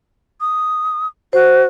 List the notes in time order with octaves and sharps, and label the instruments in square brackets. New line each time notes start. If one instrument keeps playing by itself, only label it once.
[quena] D#6
[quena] F#4 [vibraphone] C5